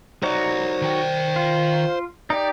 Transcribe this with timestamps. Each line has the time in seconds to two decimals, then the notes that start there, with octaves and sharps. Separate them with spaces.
0.23 F#3 D#4 F#4 C5 D5
0.82 D#3 G5
1.36 F4
2.30 D#4 G4 D5